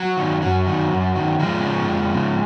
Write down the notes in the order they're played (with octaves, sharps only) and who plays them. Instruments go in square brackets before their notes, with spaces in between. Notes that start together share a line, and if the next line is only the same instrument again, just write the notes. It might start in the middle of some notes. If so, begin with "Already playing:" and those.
Already playing: [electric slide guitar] F#3
D#3
F#2 F#3
D#3
F#2
D#3
F2 F3 G#3
C#3
F2
C#3